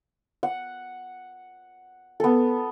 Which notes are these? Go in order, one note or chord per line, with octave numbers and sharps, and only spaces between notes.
F#5
B3 A4